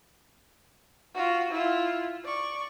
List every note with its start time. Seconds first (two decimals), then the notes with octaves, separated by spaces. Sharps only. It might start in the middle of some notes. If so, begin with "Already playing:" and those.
1.14 F4 F#4
1.51 E4 F4
2.24 D5 C#6